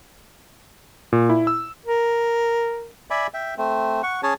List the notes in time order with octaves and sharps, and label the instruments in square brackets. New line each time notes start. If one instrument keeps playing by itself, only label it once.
[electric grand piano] A#2
E4
E6
[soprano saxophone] A#4
[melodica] D5 E5 G#5 B5
E5 G5
A3 C4
F#5 C#6
C#4 G#4 C#5 A5